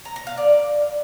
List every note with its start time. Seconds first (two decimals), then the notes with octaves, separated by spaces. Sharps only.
0.05 A#5
0.16 A#5
0.27 F5
0.38 D5